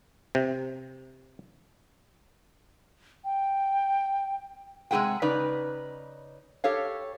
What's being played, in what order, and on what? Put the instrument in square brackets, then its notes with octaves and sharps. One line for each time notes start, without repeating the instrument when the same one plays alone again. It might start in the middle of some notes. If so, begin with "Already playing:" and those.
[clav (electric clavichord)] C3
[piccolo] G5
[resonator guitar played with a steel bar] C3 G#3 C4 G#4 F#5 G5
C#3 D#4 B4 D5
G4 A4 C#5 F5